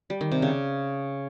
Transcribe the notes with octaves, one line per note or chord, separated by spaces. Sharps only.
G3
D#3
C3
C#3